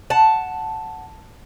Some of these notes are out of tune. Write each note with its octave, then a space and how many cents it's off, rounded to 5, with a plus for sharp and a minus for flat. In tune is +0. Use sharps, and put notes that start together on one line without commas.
F#5 +0 A5 +0